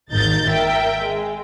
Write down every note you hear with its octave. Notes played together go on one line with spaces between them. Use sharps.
G#1 D#2 D#4 A#4 G6 A6
A#4 E5 G5
G#3